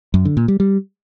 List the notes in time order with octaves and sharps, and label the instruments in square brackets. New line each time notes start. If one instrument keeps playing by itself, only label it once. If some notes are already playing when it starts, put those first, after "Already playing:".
[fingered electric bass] F#2
D3
A#2
G3
G3